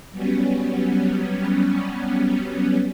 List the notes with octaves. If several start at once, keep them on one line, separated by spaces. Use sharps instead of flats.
F#3 G3 B3 C#4